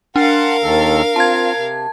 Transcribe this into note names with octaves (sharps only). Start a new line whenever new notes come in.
D4 A#4 F5 F#5 A5 C6
D#2 D#3 A4
C4 F4 A5 G#6
C3